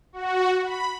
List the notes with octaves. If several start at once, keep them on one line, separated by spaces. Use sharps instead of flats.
F#4
B5